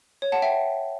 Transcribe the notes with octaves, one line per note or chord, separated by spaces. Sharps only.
C#5
F#5 A5
E5 G5